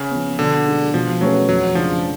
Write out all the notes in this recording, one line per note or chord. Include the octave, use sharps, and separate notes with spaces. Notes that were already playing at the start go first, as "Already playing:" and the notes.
Already playing: C#3
F3 B3
B2 D3
G#3 D4 G#4
B2 F3
F#3 A3 C#4 G#4 B4
F2 F#3
C#3 F3 G#3 D4 G#4